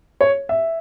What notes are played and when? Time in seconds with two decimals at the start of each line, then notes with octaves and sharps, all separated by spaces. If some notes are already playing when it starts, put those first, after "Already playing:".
0.21 C#5
0.49 E5